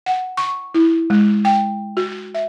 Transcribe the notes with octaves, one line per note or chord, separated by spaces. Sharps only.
F#5
C#6
E4
G#3
G5
F#4
E5